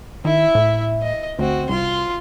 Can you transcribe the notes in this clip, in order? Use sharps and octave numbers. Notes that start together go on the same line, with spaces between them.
D#3 E4 E5
A2
D#5
D2 C4 F#4
C2 F4 C6